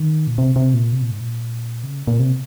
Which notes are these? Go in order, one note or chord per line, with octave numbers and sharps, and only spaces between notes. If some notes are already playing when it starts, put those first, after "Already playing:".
Already playing: D#3
A#2
C3
C3
A#2
C3
A#2
G#2
A#2
C#3
A#2
C3